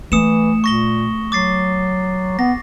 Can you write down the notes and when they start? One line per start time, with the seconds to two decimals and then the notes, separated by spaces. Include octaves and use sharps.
0.12 E3 A3 D#6 C#7 E7
0.64 A#2 C#6 A#6 G7
1.32 F#3 D6 A6 C7
2.39 B3 A#6